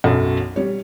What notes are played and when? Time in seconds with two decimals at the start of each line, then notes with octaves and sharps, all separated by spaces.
0.04 B1 F#2 A4 B5
0.56 G3 C#5